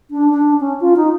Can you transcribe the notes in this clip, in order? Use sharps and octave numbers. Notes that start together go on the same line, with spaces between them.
D4
D4
C#4
F4
D#4